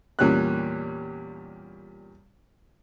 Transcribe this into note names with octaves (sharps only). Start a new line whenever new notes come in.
E2 A#2 G3 C#4 F#6